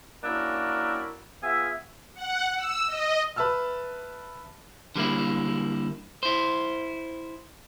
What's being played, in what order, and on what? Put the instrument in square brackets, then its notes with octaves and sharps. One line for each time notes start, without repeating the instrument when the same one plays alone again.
[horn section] A#3 C#4 D4 E4 F#4 A#4
B3 F4 G#4 E5
[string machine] F#5
E6
D#5
[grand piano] B4 E5 A5 E6 F6
[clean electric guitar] D3 G3 A#3 E4
E4 C5